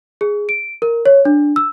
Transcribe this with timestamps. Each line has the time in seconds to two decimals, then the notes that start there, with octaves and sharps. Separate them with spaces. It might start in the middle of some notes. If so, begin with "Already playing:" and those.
0.21 G#4
0.49 D7
0.82 A#4
1.06 C#5
1.25 D4
1.56 E6